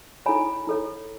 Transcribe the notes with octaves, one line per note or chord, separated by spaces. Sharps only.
E4 A4 C#5 G#5 B5
E4 A4 C#5